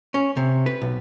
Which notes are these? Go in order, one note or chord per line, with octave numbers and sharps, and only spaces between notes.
C#4
C3
B4
B1